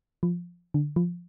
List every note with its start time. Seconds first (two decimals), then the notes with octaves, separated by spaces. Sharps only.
0.23 F3
0.74 D3
0.96 F3